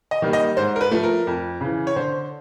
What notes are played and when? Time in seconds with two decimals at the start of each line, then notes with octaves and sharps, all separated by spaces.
0.11 D#5
0.22 D#3 G3 A#3
0.33 D#5
0.57 G#2 C5
0.76 A#4
0.81 B4
0.91 F3 A3
1.03 A#4
1.27 F2
1.61 C#3 E3
1.87 C#5
1.96 D3 C5